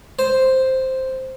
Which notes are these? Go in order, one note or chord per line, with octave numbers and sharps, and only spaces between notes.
C5